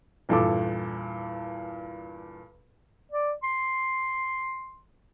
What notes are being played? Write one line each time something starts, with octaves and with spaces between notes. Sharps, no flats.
E2 G2 A#2 A4 A5 D6
D5
C6